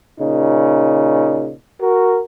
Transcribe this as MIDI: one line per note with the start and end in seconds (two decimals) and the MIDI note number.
0.20 1.52 46
0.20 1.52 49
0.20 1.52 63
1.80 2.19 66
1.80 2.19 70